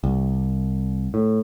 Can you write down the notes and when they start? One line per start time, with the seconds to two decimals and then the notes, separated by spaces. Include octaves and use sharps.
0.04 C2
1.14 A2